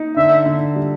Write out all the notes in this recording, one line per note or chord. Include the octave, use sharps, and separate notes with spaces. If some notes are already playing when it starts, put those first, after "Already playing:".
Already playing: D#4
D3 E5
D3
G3